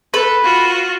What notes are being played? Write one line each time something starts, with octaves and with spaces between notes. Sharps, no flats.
A4 B4
F4 F#4